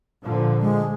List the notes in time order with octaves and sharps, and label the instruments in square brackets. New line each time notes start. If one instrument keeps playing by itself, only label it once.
[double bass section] A#2 D3 F3
[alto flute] G#3